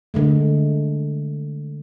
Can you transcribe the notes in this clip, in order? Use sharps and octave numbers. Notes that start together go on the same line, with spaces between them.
D3 G#3 A3